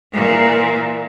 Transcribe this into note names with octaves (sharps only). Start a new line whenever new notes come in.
A#2 E3